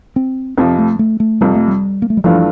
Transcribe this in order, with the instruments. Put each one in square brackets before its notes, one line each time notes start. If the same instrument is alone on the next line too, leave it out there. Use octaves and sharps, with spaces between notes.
[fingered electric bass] C4
[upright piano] F2 C3 F3 [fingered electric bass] C4
[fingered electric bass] A3
A3
A3
[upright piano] F2 C3 F3 [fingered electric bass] G3
[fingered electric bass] A3
G3
A#3
A3
G3
[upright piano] G2 E3 A3 D4 F4 [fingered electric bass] F3